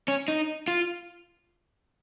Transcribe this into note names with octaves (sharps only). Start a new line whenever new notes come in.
C#4
D#4
F4